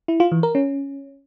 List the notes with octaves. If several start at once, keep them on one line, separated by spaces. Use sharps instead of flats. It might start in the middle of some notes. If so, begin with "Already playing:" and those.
E4
F4
E3
A#4
C#4